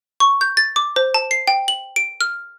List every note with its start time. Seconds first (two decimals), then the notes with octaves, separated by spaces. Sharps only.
0.20 C#6
0.41 G6
0.57 A6
0.76 D6
0.96 C5
1.14 A5
1.31 C7
1.47 G5
1.68 F#7
1.96 D7
2.21 F6